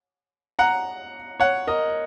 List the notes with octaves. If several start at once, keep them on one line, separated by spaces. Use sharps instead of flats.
F#5 A#5
C#5 F#5
A#4 D#5